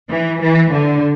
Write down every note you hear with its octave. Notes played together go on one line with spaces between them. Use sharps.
E3
E3
D3